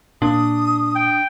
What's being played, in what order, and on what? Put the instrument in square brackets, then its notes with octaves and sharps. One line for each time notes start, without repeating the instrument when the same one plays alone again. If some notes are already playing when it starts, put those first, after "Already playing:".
[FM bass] A#2 [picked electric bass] D4 [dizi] D#6
[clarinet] G5